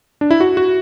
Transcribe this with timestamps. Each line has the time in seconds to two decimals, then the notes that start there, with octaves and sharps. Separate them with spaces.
0.21 D4
0.31 E4
0.40 F#4
0.57 F#4